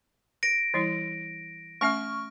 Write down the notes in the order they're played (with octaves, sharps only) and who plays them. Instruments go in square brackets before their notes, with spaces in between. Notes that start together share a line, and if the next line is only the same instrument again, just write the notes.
[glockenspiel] A#6 D7
[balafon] E3 G3 E4
[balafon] A3 C#4 E5 [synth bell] C#6 F6